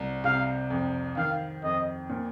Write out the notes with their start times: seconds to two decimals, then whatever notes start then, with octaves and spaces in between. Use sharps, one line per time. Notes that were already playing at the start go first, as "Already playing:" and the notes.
Already playing: C2
0.24 C3 F5
0.70 F2
1.17 D#3 F5
1.63 F2 D#5
2.10 A#2